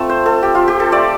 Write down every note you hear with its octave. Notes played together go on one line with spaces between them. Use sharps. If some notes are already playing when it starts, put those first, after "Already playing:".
Already playing: A3 C4 F4 A4
C5
A4
G4
F4
G4
A4
A3 F4 D5